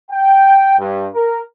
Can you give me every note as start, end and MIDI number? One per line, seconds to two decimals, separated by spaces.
0.11 0.75 79
0.79 1.07 43
1.14 1.39 70